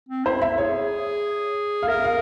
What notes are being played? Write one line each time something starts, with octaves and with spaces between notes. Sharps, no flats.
C4
E4 C5
E5
G#4 C#5
F5
A#4 E5
F5